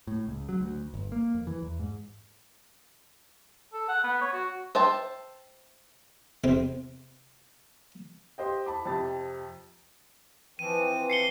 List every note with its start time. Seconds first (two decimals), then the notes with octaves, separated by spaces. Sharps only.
0.07 A2
0.28 C#2
0.49 F#3
0.60 D2
0.94 G1
1.12 A#3
1.35 F2
1.47 E3
1.62 E2
1.79 G#2
3.73 A4
3.89 F#5
4.04 B3
4.21 C#5
4.33 F#4
4.75 C5 E5 G5 A5
6.44 E2 C3 C4 C6
8.38 G4 C5 D#5 G5
8.66 A5 B5 D6
8.85 F2 C3 G4 A5 A6
10.59 E3 F3 C4 D#7
11.10 C7 C#7 G7